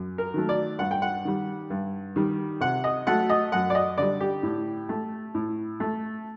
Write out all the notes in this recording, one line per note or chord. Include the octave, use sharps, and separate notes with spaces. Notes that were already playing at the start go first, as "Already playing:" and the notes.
Already playing: F#2
A#4
D#3 F#3 A3
D5
G2 F#5
G5
F#5
D#3 G3
G2
D#3 G3
C3 F#5
D#5
F#3 A3 F#5
D#5
F#2 F#5
D5
D#5
D3 G3 D5
G4
A2
A3
A2
A3